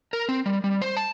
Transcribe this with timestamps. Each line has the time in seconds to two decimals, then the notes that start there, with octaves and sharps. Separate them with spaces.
0.13 A#4
0.29 C4
0.46 G3
0.64 G3
0.82 C5
0.97 A5